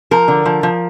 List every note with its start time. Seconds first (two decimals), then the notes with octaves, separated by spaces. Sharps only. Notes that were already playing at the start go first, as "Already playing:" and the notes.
0.11 F3 A#4
0.28 D3
0.46 F3
0.63 F3